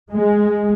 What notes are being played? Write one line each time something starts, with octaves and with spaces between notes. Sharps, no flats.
G#3